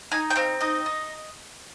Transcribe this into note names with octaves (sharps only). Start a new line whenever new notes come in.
D#4 G#5
G5
C4 F5
D#4 D#5
D#4